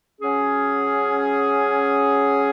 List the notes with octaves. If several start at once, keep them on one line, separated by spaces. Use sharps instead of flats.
F#3 C#4 G#4